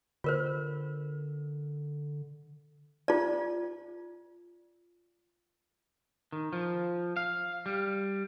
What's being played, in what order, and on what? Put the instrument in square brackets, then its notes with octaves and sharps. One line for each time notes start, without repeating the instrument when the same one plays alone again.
[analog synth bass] D3 [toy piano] F4 A#4 C5
[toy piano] F4 D5
[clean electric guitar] D#3
F3
F5
G3